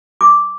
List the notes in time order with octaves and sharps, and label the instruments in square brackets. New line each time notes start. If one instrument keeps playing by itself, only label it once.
[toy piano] D6